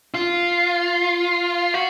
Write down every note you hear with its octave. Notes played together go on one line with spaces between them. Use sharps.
F4
F#4